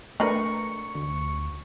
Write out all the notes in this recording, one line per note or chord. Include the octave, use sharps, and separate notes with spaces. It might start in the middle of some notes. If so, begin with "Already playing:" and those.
A3 D4 A#4 B4 C#6
D2